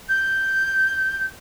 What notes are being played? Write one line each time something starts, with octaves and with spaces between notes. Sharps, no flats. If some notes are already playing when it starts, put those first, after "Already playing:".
G6